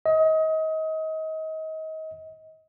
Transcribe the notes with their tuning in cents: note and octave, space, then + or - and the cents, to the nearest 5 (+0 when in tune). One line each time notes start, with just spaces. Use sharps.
D#5 +30